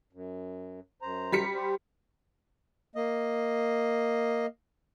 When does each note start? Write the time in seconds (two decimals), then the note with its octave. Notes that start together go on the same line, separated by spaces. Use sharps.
0.13 F#2
1.02 F#2 C5 A#5
1.32 G3 B6 C#7
1.55 G4 C5
2.95 A#3 D#5